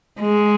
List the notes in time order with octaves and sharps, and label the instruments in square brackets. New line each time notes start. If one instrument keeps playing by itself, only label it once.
[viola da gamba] G#3